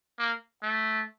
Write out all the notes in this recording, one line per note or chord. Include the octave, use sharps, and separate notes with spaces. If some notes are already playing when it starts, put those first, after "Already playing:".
A#3
A3